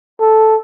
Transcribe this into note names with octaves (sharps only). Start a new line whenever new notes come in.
A4